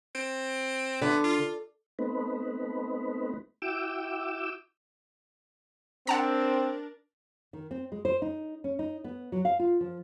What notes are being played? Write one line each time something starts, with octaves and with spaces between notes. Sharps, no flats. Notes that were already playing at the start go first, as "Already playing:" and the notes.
C4
D3 B3
F4
A3 B3 C4 D#4 B4
E4 F#4 G5 D6 E6
C4 D4 A#4 F#5 A5 A#5
D#3
C4
G#3
C5
D#4
C#4
D#4
B3
F#3
F5
F4
F3